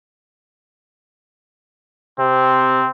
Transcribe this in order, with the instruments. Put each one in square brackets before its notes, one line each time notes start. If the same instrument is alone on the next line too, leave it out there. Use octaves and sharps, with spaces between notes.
[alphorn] C3 [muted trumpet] C4